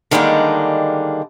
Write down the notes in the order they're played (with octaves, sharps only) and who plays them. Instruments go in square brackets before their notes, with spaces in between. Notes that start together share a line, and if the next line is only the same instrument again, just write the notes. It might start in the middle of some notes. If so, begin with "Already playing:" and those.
[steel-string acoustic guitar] D3 D#3 G3 G#3 A#3 D4